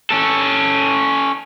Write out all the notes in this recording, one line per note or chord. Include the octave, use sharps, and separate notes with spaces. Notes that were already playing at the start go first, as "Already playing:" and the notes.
C#4 A4